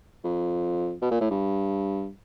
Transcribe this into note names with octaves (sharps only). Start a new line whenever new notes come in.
F2
B2
A#2
A2
G2